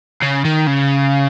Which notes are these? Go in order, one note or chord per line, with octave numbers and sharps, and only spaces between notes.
C#3
D#3
C#3